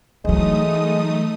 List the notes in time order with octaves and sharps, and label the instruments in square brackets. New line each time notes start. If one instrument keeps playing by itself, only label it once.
[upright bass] E3 F#3 [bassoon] G#3 [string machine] A3 D#4 D#6